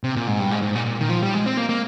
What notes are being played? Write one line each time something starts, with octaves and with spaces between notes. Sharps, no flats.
C3
A#2
G#2
G2
G#2
G#2
A#2
A#2
D#3
F3
G3
G#3
C4
A#3
A#3